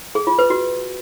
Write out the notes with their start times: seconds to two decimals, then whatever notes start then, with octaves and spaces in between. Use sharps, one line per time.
0.15 G#4
0.27 F4
0.39 B4
0.50 F#4